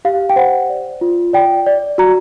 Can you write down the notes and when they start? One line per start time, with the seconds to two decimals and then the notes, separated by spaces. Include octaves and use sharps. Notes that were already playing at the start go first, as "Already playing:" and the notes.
0.05 G4 F5
0.30 G5
0.36 C5 F#5
0.69 D5
1.01 F4
1.33 D5 G5
1.66 D5
1.98 F#4 A#5